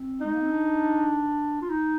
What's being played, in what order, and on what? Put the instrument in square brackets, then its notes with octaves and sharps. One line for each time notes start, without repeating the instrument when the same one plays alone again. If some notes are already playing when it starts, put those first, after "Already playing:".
Already playing: [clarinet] C4
[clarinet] G#3 [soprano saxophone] D#4
[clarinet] A#3
C4
D4
F4
D#4